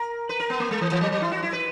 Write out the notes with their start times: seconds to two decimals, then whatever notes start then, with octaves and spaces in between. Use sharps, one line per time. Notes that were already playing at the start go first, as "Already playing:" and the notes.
Already playing: A#4
0.29 B4
0.40 A#4
0.50 B3
0.60 A#3
0.71 G#3
0.81 E3
0.92 E3
1.01 F#3
1.12 F#3
1.22 E4
1.32 F#4
1.42 E4
1.53 B4